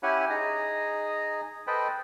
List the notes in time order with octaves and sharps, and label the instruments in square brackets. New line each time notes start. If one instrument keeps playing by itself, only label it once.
[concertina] C#4 E4 G4 C#5 F#5 G#5
D#4 G#4 A#5
A4 B4 C5 D#5 G5 B5